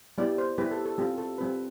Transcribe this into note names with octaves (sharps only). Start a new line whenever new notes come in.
G3 B3 E4 G4 D5
C5
G3 B3 E4 G4 B4
A4
A4
G3 C4 F4 G4
A4
G3 C4 F4 B4